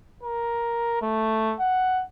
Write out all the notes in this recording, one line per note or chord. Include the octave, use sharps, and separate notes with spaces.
A#4
A3
F#5